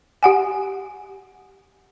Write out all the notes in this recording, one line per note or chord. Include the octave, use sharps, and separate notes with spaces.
G4 F#5 G#5